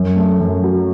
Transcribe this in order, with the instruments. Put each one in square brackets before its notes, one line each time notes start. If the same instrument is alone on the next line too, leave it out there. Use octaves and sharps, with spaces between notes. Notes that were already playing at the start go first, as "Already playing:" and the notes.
Already playing: [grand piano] F#2
A3
F#2
F#3